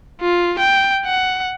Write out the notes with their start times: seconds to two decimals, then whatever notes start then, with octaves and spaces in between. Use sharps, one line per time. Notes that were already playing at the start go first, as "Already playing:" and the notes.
0.21 F4
0.58 G5
1.05 F#5